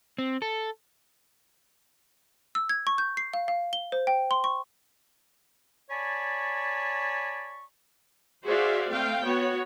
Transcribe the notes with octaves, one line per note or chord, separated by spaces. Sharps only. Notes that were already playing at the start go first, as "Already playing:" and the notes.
C4
A4
E6
G#6
C#6
G6
C7
F5
F5
G7
C5
G5
C6
C#6
C#5 D5 G#5 A5 B5 C#6
F#4 G#4 C5 D5 E5 F5
A3 C4 F5 G5
B3 F#4 C#5